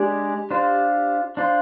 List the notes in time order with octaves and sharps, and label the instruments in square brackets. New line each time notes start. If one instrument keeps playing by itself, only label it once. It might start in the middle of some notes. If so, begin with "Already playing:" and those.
Already playing: [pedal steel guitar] G#3 D4 G#4 D5 [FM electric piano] G4
[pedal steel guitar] D4 F4 C5
D4 F4 C5